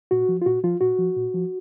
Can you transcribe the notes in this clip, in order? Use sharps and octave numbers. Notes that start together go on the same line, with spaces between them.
A#2 F#4
F3
F4
A#2 F#4
F3 F4
A#2 F#4
F3
A#2
F3